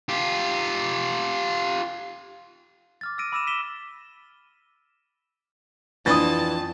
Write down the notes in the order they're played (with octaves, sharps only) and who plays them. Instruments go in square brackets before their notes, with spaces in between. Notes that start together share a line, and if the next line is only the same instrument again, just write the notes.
[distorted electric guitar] F4 G4
[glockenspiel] D6 F6 A6
E6 F6 A6 A#6 D7 D#7
B5 D6 E6 A#6 D#7 E7
B6 D#7 E7 G7
[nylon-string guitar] F2 D4 [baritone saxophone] E3 [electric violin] A5 [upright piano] D#6 A6